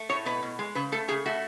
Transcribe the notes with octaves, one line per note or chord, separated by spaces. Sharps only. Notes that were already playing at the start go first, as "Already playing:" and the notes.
Already playing: A3
A2 C#5
B2 B4
B2
G#3
C#3 B4
A3 A4
C#3 G#4
A3 F#4